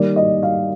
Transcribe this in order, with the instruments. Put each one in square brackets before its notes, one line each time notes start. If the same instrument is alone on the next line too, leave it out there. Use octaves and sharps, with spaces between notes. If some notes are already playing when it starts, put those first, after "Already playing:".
Already playing: [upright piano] D#3 G3 A#3 D5
D#5
F5